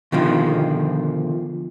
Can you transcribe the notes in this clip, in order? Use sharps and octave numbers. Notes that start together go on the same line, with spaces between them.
B2 D3 D#3 F3